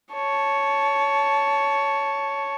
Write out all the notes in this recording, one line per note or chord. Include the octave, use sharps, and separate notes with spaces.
C#5 A5